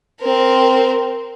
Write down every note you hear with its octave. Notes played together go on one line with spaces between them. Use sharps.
C4 A#4